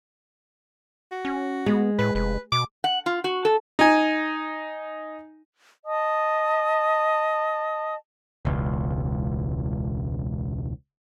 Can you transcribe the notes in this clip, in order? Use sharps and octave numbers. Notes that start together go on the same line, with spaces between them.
F#4
C#4
G#3 B3
A2 B4
F1 B4
B2 D6
F#5
F4
F#4
A4
D#4 G#5
D#5 A5 D#6
E1 C#2